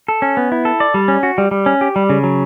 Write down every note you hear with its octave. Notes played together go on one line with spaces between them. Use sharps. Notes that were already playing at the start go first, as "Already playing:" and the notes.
A4
C#4
B3
E4
A4
D5
G3
C#4
F#4
G3
G3
C#4
G4
G3
C#3
F#3